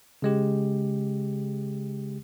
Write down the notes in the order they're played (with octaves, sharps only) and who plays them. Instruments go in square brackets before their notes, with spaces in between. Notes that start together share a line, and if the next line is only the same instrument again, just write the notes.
[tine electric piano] C#3 G#3 G4